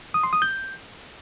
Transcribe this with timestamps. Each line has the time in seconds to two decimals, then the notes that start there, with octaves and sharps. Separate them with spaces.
0.14 D#6
0.23 C6
0.33 D#6
0.42 G6